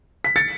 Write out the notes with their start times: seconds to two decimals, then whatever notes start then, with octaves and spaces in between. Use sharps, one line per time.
0.24 B6
0.36 A6 C#7